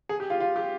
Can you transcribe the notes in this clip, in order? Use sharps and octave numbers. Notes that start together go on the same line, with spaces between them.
G#4
G4
F4
F4
G4